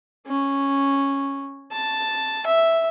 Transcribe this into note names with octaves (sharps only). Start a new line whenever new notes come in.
C#4
A5
E5